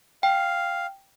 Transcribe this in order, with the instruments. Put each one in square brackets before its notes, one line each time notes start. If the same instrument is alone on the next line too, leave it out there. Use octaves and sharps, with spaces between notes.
[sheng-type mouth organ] F5 [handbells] G5